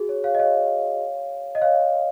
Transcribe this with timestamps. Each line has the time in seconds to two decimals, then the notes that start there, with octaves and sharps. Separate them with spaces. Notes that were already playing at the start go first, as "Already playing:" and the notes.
Already playing: F#4 G#4
0.09 C#5
0.24 C#5 F5
0.35 D#5
0.39 C#5 F5
1.55 D#5
1.62 C#5 F5